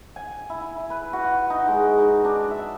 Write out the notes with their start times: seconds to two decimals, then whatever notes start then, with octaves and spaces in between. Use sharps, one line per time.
0.16 G#5
0.50 E4
0.76 E4
0.90 B4
1.13 F#4
1.50 D#4
1.68 G#3
1.99 D#4
2.25 D4
2.51 E5